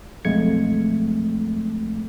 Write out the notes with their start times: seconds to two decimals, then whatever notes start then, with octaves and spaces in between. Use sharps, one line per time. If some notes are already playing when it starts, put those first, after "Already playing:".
0.25 B1 F2 G#3 A3 G#6 C#7